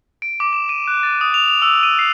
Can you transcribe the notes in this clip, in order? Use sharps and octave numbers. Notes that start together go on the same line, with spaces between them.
D7
D6
E7
D#7
F#6
A6
D#6
F7
F7
E6
D#7
C7